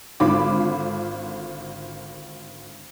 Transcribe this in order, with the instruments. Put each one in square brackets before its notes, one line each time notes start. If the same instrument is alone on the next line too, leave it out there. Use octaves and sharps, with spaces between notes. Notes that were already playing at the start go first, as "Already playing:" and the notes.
[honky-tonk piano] G#1 D3 F4 B5 D6